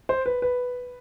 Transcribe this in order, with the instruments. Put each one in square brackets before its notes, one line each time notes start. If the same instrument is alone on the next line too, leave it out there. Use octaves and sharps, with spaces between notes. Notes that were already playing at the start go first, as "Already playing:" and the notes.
[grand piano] C5
B4
B4